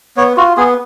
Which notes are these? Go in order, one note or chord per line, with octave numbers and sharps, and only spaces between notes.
B3 C#5
F4 F#4
B3 G#4